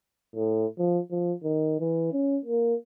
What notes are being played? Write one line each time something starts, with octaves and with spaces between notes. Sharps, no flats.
A2
F3
F3
D#3
E3
C#4
A#3